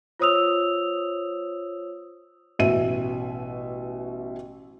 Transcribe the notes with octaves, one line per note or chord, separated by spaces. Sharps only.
F4 C5 C#5 D#6 E6 F7
A1 B2 E5 D#7